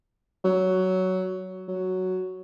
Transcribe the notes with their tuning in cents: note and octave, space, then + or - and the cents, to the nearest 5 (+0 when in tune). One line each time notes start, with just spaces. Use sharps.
F#3 +10
F#3 +5